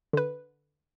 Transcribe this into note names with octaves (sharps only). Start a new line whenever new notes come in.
D3 B4